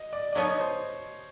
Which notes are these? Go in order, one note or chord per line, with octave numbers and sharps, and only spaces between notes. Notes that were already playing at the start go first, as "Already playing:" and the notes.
Already playing: D#5
D5
D5
B2 F#3 B3 D#4 C#5
C5